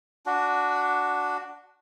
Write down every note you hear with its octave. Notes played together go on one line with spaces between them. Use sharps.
D4 F#4